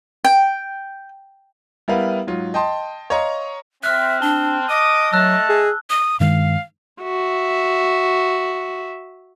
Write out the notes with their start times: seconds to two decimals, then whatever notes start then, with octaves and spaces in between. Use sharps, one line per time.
0.24 G5
1.88 G3 B3 E4 A#4 B4 F5
2.27 G#2 F#3 F4
2.54 D#5 G5 A5 C6
3.10 C#5 D#5 F5 A#5 C6 C#6
3.83 C4 E5 F6 F#6
4.22 D4 A5 G7
4.68 D#5 D6 D#6
5.13 F#3 A3 A5 E6 F#6
5.49 G#4
5.90 D#6
6.20 G2 D#3 G#3 F5
7.02 F#4 E5